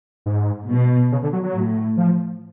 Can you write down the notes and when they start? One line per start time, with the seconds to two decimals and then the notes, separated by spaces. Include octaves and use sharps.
0.26 G#2
0.69 B2
1.12 C#3
1.23 D3
1.33 F#3
1.43 F#3
1.55 A2
1.97 F3